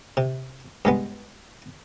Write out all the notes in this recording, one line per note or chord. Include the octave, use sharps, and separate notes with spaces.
C3
G2 G#3 B3